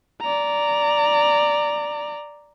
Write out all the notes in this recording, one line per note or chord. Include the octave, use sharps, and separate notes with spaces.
D5 A#5